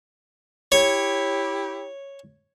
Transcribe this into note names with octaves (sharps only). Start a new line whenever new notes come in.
E4 G4 C#5